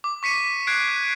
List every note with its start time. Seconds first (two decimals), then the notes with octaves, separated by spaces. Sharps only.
0.04 D6
0.23 C#6 B6 C#7 D#7
0.67 F#6 G#6 C7 D7
0.89 F#6